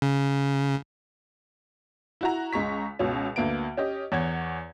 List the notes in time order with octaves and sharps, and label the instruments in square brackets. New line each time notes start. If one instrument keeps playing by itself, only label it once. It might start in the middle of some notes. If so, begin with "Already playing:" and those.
[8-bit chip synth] C#3
[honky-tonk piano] E4 F#4 A#5
C#2 G#3 A#5 C#6 B6
C#2 B2 C#4
D2 A#3 B3 D7
C#4 G4 D#5
E2 C#5 F#5 G#6